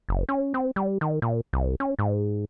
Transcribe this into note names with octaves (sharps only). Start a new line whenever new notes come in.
F#1
C#4
C4
G3
D#3
A#2
C2
C#4
G#2